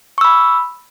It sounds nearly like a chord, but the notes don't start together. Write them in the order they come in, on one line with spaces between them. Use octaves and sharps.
C#6 E6 B5